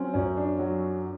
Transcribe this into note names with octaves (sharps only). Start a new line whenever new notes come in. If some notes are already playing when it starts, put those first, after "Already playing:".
Already playing: F#3 C4 C#4
F#2 C#4
D4
F#3